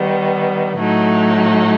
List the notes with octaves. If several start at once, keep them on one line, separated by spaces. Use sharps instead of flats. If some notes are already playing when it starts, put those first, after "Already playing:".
Already playing: D#3 G3 B3
A2 F#3 A3 D#4